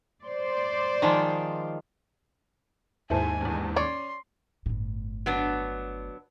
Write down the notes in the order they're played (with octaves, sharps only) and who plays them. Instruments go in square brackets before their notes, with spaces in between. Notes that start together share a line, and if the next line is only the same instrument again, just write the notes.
[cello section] C5 D5
[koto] D#3 F3 G#3
[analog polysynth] D#2 G#2 [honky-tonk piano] E4 A4 C5 [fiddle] G#5
[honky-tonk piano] E2 G2
[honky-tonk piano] C#4 [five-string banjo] C#5 D5 [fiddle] C6
[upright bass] G1 A2
[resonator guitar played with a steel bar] F#3 B3 D4